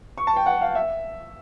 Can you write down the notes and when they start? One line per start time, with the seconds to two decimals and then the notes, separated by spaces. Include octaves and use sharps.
0.18 C#6
0.27 A5
0.36 G5
0.46 F#5
0.61 F5
0.75 E5